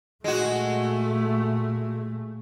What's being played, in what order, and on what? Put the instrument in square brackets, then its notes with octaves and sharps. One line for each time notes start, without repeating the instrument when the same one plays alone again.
[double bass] A#2 A3 [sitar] G#3 F#4